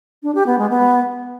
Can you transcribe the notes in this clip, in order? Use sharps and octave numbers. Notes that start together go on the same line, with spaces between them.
D4
G4
B3
G#3
B3